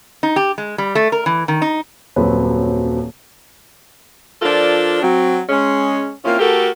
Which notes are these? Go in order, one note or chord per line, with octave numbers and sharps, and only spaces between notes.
D#4
G4
G#3
G3
A3
A#4
E3
D#3
D#4
D#1 F#2 F#3 C4 B4
F3 D4 F4 A4 A#4 D5
F#3 C4
G#3 C#4
A#3 C4 C#4 E4 F4
A3 F#4 G4 A4 A#4